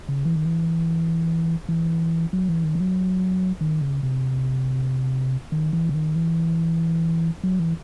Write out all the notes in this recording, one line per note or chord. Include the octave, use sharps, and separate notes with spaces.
C#3
E3
D#3
E3
E3
F#3
E3
D#3
E3
F#3
D#3
C#3
C3
D#3
E3
C#3
D#3
E3
F#3
E3